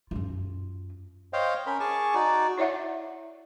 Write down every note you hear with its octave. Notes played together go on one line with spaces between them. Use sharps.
F#2 F4
C5 C#5 D#5 F5 G5
C#4 A#4 B5
G#4 G#5 A5 C#6 D6
D#4 F#4 D5
E4 C#5 D5 E5 F#5